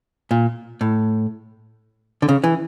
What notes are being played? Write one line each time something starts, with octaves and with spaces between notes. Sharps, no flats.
A#2
A2
D3
C#3
E3